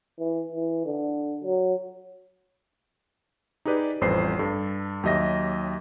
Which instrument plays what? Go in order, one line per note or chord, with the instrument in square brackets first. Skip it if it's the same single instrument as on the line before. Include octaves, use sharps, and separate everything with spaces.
[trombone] E3
E3
D3
F#3
[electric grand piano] D#4 G4 G#4 B4 D5
A1 F2 G3 B4 C5 C7
G2 A4
D#2 F#3 G4 D#5 E5 A#6